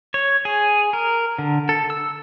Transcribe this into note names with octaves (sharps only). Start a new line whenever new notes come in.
C#5
G#4
A#4
D3
A4
E6